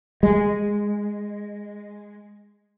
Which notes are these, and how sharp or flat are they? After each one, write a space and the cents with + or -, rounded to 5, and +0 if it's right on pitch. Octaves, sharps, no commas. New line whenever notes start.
G#3 -10